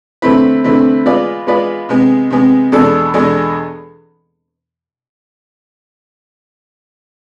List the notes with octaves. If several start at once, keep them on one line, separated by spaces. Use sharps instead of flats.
D3 A3 C4 E4 B4
D3 A3 C4 E4 B4
G#3 B3 F4 B4 D5
G#3 B3 F4 B4 D5
C3 G#3 B3
C3 G#3 B3
E2 B2 G#3 D4 A4
E2 B2 G#3 D4 A4